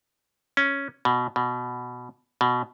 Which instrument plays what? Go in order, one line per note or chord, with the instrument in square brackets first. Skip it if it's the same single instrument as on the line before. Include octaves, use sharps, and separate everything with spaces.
[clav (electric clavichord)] C#4
B2
B2
B2